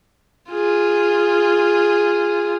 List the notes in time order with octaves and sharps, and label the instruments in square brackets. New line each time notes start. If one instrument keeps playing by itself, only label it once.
[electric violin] F4 G#4